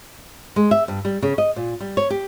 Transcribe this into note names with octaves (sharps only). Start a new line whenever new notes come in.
G#3
E5
G2
G3
C#3
D#5
A#2
G3
C#5
G4